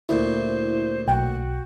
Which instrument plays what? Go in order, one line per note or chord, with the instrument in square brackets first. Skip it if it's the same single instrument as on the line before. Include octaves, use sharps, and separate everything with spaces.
[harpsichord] D2 A#2 [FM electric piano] E4 [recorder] C5
[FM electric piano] B1 [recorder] F#4 [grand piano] G5